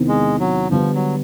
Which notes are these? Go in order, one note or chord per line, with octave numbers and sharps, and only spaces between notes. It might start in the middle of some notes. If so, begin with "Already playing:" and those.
Already playing: E2 C3 D#3
G#3
F#3
D3 F3 G3 B3
F#3